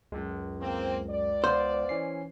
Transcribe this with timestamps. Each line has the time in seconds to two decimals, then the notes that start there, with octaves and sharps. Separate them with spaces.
0.12 C#2 F#2 G#3
0.60 A#3 C4
1.10 D5
1.44 B3 C5 F5
1.89 E3 C#4 C7